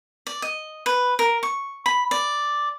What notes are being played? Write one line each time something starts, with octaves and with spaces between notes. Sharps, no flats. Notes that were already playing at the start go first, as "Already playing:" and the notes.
D5
D#5
B4
A#4
C#6
B5
D5